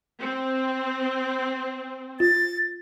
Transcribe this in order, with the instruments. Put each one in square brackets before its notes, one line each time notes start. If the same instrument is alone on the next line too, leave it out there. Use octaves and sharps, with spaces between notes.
[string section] C4
[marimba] F4 [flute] A6